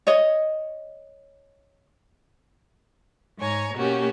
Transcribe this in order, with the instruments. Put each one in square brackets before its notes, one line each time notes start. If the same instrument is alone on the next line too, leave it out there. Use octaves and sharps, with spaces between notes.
[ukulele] C#5 D#5
[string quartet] G#2 C#5 G#5 A#5
B2 A#3 C#4 F#4 G4